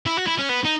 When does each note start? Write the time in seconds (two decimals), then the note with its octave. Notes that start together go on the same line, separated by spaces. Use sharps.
0.06 E4
0.17 F#4
0.27 E4
0.38 C#4
0.49 B3
0.64 D#4